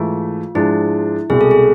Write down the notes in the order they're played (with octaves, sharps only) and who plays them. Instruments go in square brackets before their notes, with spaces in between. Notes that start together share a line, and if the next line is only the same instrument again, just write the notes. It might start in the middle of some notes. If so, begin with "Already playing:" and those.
Already playing: [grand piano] G#2 E3 A3 [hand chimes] F4
[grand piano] G#2 F3 G#3 D4 [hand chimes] E4
[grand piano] C2 B2 G#3 [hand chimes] G#4
[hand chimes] A4
G#4